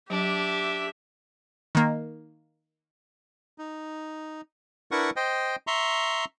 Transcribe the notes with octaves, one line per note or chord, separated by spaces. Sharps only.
F#3 D4 G4 E5
D#3 A#3
D#4
D4 E4 A#4 B4 F#5 C#6
C5 D#5 G5
E5 A#5 C6 C#6